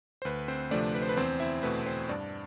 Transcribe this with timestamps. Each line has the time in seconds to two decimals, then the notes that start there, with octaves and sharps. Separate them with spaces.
0.22 C5
0.25 D2 B4
0.48 C4 C5
0.71 C3 F3 A3 D4 D5
0.94 B4
1.02 C5
1.09 B4
1.17 E2 C4 C5
1.40 E4 E5
1.63 B2 A3 B4
1.86 C4 C5
2.09 G2 D4 D5